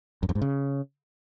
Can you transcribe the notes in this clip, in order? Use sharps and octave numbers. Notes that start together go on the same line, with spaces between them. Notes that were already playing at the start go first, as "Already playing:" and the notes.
F#2
F2
G#2
C#3